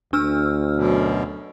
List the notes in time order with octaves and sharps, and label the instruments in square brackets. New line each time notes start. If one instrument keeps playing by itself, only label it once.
[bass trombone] D2 [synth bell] D4 E6 F6
[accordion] F#2 B2